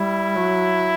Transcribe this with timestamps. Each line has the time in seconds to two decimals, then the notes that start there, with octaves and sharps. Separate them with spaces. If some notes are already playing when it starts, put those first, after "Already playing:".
Already playing: G3 E4
0.36 F#3